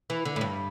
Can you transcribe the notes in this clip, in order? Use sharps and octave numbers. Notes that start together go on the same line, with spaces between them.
E3
D3
A2
G2